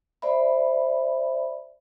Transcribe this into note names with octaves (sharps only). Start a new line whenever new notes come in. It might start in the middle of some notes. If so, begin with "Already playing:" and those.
C5 D5 E5 B5